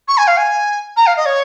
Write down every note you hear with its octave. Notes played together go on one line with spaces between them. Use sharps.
C#6
G#5
F5
G#5
A#5
F5
D#5
C#5